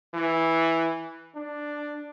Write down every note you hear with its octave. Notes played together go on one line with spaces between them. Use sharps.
E3
D4